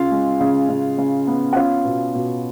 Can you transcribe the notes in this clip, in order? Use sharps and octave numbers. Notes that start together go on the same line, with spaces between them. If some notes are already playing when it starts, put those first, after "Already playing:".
Already playing: C#3 F4 F5
G#3
C#3
C#3
C#3
B3
F#5
C#4 F4 F5
B2
B2